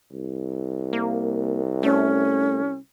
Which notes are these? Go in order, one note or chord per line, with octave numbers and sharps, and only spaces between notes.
C2
A#3
A3 C#4